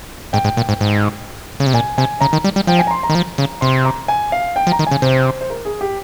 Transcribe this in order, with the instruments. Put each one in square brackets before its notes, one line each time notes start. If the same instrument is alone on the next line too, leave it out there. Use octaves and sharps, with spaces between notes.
[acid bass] G#2 [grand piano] G5
[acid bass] G#2
A#2
G#2
G#2
C#3
C3
[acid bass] A#2 [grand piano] G#5
[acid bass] C3 [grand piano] G#5
[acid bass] C#3 [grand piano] A#5
[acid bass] D#3
G3
G3
[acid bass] F3 [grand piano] G5
[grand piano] G#5
A#5
C6
A#5
[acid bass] D#3
F3
C#3
[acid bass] C3 [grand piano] C6
[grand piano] A#5
G#5
F5
G5
[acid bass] F3
[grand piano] A#5
[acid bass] D#3
[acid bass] C#3 [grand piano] G#5
[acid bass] C3 [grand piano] C5
[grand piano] C5
A#4
G#4
G4